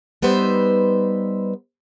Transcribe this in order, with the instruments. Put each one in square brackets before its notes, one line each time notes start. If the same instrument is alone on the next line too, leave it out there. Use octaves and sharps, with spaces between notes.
[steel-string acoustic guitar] G3 B3 D#4 B4 C5 E5